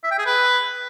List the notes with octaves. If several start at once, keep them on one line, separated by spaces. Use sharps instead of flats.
E5
G5
G#4
B4